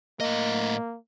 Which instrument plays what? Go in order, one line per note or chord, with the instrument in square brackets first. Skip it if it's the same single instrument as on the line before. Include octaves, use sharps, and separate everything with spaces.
[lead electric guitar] A2 D#5 [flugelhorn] A#3